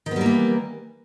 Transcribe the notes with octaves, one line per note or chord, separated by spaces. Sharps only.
D#3 E3 G3 A#3 B3